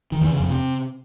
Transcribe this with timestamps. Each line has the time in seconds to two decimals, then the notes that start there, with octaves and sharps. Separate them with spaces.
0.12 D#3
0.21 E2
0.30 C#3
0.40 F2
0.49 C3